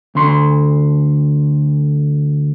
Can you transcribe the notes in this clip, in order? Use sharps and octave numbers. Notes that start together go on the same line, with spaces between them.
D2 C6